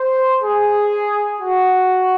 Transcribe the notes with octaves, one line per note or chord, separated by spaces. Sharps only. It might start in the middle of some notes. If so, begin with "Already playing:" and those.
Already playing: C5
G#4
F#4